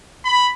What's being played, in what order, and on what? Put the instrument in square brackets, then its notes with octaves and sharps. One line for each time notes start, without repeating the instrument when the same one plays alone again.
[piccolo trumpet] B5